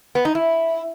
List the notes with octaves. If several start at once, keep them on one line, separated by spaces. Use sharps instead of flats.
B3
D#4
E4